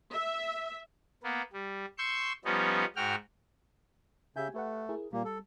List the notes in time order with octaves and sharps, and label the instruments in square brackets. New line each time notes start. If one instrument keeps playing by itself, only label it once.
[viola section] E5
[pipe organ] A#3 B3
G3
C6 C#6 E6 G6
F3 G3 B3 C#4 D#4
G#2 F#4 G5 F6
[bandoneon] C#3 E5 G6 [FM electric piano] G4 G#5
[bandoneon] A3 [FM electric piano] G4 B4 F#5
[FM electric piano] E4 G#4 A#4
[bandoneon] A#2 A#3 [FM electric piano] G3
[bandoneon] A4